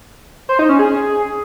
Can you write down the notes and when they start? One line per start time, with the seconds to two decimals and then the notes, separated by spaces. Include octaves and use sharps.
0.49 C5
0.59 D#4
0.69 C#4
0.79 G#4